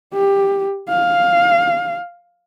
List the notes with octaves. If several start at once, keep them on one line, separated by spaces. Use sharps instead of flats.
G4
F5